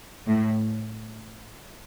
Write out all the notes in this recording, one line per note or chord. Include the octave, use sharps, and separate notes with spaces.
A2